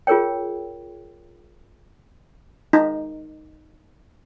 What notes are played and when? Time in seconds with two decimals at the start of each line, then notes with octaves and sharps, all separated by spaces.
0.07 F4 G#4 A#4 C#5 G5
2.73 D#4